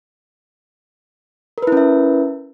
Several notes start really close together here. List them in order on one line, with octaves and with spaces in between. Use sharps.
A#4 B4 E4 C#4 E5